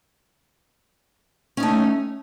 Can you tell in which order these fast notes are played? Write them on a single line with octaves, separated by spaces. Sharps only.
C#4 D#4 A3